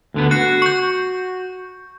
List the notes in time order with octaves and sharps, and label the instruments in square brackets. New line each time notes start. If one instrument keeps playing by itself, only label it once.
[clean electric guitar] D2 D3 B3
[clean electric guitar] F#4 [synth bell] F#6 C7
[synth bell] C#6 G6